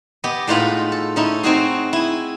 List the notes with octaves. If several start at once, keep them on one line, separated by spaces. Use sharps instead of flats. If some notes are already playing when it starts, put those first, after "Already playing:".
B3 G4 D#5
A2 G#3 D#4 F4 B4 B5
A4
C#4 D#4 E4
C4 D#4 F#4 G#4
E4 G#5